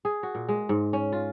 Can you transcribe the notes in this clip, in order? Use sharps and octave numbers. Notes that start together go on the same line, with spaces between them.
G#4
F#4
A#2
G#3
G#2
C#4
F4